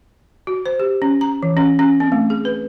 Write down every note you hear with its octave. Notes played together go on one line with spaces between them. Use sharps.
F#4
C5
G4
C#4
A#5
E3
C#4
C#4
C4
A3
G#4
B4